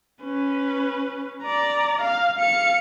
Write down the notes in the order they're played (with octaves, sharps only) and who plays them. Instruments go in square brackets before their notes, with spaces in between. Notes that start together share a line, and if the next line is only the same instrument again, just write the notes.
[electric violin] C#4 B4
D5 A#5
F5
F5 C#7